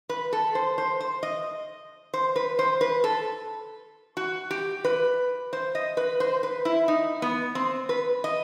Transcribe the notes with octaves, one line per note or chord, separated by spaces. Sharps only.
B4
A4
C5
C5
C5
D#5
C5
B4
C5
B4
A4
F#4
G4
B4
C5
D#5
B4
C5
B4
E4
D#4
B3
C4
B4
D#5